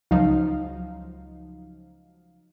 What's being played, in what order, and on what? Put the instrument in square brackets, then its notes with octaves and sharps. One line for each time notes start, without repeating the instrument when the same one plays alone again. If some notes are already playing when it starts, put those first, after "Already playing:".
[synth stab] C#2 F3 F#3 D#4 F5